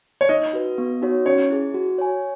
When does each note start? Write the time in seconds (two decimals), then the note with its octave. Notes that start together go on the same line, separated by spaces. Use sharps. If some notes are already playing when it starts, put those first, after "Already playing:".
0.21 C#5
0.29 D#4 D#5
0.53 F#4 B4
0.78 B3
1.02 D#4 F#4 C#5
1.26 C#4 C#5
1.50 E4 G#4
1.74 F#4
1.98 C#5 G#5